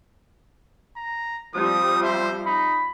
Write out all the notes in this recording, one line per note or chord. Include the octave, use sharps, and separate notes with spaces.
A#5
F3 G3 C4 D#6
C5 E5
D#4 B5